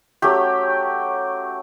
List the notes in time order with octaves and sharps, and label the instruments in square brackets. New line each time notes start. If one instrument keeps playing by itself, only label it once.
[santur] F#3 A3 C#4 G4